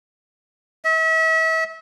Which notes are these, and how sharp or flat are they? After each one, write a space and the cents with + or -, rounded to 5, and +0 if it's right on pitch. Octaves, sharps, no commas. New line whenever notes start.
E5 -35